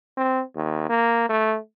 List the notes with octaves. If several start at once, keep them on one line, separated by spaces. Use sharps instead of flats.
C4
D#2
A#3
A3